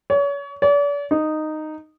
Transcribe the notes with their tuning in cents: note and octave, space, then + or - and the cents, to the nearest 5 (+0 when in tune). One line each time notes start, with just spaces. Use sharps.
C#5 +35
D5 -40
D#4 -10